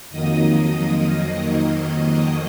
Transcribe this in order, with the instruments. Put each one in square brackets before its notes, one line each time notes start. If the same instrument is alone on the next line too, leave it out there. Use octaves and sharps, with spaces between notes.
[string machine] F2 D#3 F#3 A#3 D#5 D#6